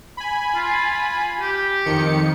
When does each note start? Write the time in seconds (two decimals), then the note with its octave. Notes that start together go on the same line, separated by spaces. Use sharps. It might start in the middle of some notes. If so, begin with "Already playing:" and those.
0.17 G#5 B5
0.55 F4
1.41 G4
1.85 F2 D#3 C#7